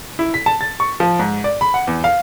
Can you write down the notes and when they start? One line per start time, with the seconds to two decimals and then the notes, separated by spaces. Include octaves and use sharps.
0.19 E4
0.34 B6
0.46 A5
0.61 A6
0.80 C#6
1.00 F3
1.19 G#2
1.44 D5
1.61 B5
1.74 F#5
1.87 E2
2.04 F5